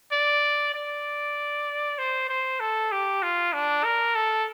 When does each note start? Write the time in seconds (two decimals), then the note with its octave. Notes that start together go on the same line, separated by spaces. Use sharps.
0.12 D5
0.74 D5
1.98 C5
2.29 C5
2.60 A4
2.91 G4
3.23 F4
3.53 D4
3.84 A#4
4.15 A4